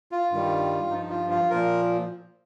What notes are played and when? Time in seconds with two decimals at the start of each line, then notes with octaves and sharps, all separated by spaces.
0.12 F4
0.31 G2 D#3 G3
0.90 G2 F3 D#4
1.10 F4
1.30 F4
1.50 A#2 F3 A#4